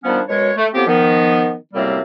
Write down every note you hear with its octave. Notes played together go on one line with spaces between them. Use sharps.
D#3 F3 G3 B3 C#4 D4
F#2 B2 G#3 C#5
A3
A2 F3 B3 C4 G4
D#3 F3 B3
F#2 A2 C3 G3 A#3 C4